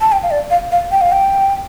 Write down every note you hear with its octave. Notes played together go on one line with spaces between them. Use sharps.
A5
G5
F5
D5
F5
F5
G5
F5
G5